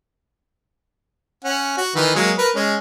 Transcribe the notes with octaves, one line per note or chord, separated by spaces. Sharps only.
C#4 F#5
F#4
D#3 E3 B4
F#3 G#3 A#3
A#4 B4
G#3 C#4